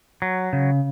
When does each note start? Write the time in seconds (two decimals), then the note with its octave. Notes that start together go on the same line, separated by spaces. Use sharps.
0.22 F#3
0.53 C#3